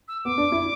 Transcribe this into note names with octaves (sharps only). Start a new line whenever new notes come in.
E6
B3 D6
D4
E4